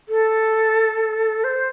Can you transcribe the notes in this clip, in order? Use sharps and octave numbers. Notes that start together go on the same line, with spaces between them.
A4
C5